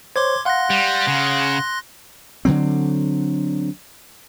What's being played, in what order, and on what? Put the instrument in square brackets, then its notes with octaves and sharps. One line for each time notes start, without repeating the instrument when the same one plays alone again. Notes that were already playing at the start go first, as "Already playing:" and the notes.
[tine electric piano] C5 C#5 [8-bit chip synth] C6 D6 G#6
[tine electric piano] F5 F#5 [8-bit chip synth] C6 F#6 A#6
[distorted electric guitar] G3
C#3
[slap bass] D3 E3 F#3 C4